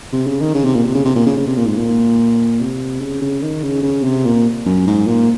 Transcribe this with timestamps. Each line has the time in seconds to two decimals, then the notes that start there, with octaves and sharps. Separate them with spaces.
0.13 C3
0.27 C#3
0.41 D#3
0.55 C#3
0.65 C3
0.75 A#2
0.84 C3
0.95 C#3
1.05 C3
1.16 A#2
1.26 C#3
1.37 C#3
1.47 C3
1.57 A#2
1.67 G#2
1.78 A#2
2.60 C3
3.01 C#3
3.22 C#3
3.42 D#3
3.63 C#3
3.83 C#3
4.03 C3
4.25 A#2
4.66 F#2
4.87 G#2
5.07 A#2